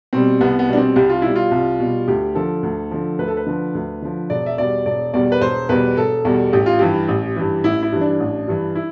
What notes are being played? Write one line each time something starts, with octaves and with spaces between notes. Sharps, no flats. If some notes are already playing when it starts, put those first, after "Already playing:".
B2 G3 C4
C2 B3
B3
B2 G3 D4
C4
C2 G4
F4
B2 G3 E4
F4
C2
B2 G3
D2 G4
D3 F3 A4
D2
D3 F3
D2 B4
A4
B4
D3 F3
D2
D3 F3
E1 D5
E5
E2 B2 G3 D5
E1 D5
E2 B2 G3 D5
B4
E1 C5
E2 B2 G3 B4
E1 A4
E2 B2 G3
A1 G4
F4
G2 E3 G4
A1
G2 E3
A1 E4
E4
G2 E3
D4
A1
G2 E3
E4